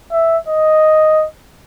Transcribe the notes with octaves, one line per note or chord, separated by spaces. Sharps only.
E5
D#5